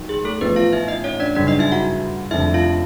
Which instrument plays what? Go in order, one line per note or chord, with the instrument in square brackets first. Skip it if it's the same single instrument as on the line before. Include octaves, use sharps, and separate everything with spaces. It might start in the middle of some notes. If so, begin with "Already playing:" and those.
Already playing: [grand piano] D#2 F#3
[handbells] G#4
A3 A4
[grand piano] A1 A2 F3 [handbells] B3 B4
[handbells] F4 F5
E4 E5
D#4 D#5
C#4 C#5
D4 D5
[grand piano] G1 F#2 C#3 [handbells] D4 D5
[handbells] D#4 D#5
E4 E5
F#4 F#5
[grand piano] F1 F2 D3 [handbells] E4 E5
[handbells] F4 F5